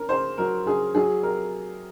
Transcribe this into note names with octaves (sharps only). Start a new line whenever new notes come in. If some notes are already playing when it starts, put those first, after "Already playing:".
Already playing: C#4 A#4
C#3 C5
F#3 A#4
C#3 G#4
F#3 G#4
C3 A#4